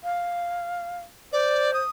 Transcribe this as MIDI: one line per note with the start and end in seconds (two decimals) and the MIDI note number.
0.04 0.99 77
1.32 1.81 72
1.32 1.71 74
1.74 1.90 87